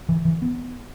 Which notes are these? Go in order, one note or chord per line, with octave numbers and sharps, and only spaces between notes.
E3
E3
B3